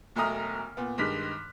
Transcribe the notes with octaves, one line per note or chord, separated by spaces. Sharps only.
E1 B1 A3 A#5 D#6 F6
A#2 B3
G2 D#3 G#3 F6 F#6 B6